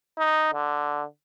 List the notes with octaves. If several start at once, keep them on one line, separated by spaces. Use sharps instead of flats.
D#4
D3